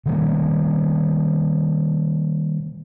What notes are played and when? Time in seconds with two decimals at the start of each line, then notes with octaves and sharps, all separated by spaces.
0.06 C3 D#3 G3 A#3